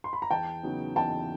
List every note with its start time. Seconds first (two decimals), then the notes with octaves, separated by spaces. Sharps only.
0.04 C6
0.13 B5
0.22 A#5
0.31 E2 G5 A5
0.63 C#3 F#3 B3 D#4
0.96 E2 G5 A5